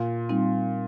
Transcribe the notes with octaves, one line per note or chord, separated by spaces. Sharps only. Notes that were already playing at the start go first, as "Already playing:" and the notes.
Already playing: A#2
G3 C4 D#4